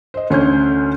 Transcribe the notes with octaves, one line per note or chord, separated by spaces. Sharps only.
C5 D#5
D2 C#4 C#5 G6